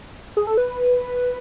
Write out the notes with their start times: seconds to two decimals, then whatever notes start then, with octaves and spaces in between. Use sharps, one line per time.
0.37 G#4
0.47 A4
0.57 B4